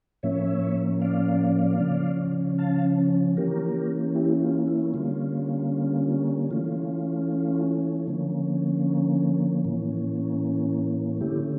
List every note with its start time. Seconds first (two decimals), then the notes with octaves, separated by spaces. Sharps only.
0.23 A2 F3 A#3 C#4 C#5 E5
1.02 D5 F5
1.80 C#3 F3 C#4
2.58 F5 A5
3.37 E3 A#3 C#4 G4 A#4
4.15 E4 G4
4.41 F4
4.68 E4
4.94 D3 G3 A#3 C#4 F4
6.51 E3 A3 C#4 F4
8.07 D3 F3 A#3 C#4
9.64 A2 E3 A#3 C#4
11.21 D3 A3 C#4 E4 G4